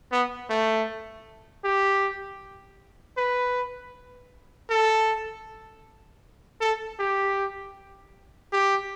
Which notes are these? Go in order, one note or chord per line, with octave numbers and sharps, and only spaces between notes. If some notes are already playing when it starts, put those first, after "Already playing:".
B3
A3
G4
B4
A4
A4
G4
G4